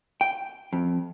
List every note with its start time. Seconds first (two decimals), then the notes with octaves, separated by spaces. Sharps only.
0.21 G5
0.73 F2